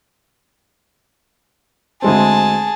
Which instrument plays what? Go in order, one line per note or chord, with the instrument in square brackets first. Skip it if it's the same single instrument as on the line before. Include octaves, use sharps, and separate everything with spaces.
[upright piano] D2 G#3 C4 [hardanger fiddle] G#4 A5